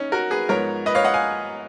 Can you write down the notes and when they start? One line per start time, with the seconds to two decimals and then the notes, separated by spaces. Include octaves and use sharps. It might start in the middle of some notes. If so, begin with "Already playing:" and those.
Already playing: C#4 D#4
0.12 F#4 A#4
0.31 G#4 B4
0.49 G#2 F3 B3 A#4 C#5
0.86 B4 D#5
0.95 C#5 F5
1.04 D#5 F#5
1.14 F5 G#5